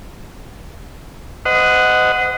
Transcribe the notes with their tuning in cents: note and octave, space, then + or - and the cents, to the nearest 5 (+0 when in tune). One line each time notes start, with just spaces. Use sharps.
C5 -40 D#5 +0 F#5 +0